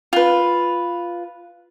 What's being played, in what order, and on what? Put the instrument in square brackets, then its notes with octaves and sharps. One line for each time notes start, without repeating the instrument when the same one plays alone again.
[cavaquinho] F4 B4